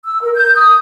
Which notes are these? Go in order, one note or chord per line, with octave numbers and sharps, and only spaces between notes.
E6
A#4
G6
D#6